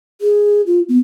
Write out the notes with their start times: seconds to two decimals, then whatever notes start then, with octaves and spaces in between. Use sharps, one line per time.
0.21 G#4
0.67 F4
0.89 B3